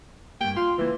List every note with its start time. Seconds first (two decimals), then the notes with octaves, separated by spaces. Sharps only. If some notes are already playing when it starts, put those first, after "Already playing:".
0.41 G2 A#3 G5
0.57 F4 C6
0.78 C#2 E3 A#3